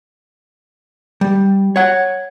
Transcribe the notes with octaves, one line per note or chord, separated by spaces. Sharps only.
G3
C#5 F#5